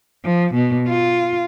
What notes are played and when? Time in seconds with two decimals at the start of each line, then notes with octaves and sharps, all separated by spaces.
0.25 F3
0.55 B2
0.88 F4